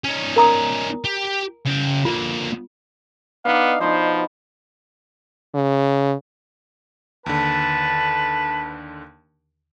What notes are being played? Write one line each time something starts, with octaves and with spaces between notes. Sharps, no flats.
C#4 D#4
A#4 A#5 D#6
G4
C#3 G5
D3 A#3 F4
B3 D4 D#4 D#5 F5
B2 F3 D#4 B4 C5
C#3
D#2 D3 B4 A5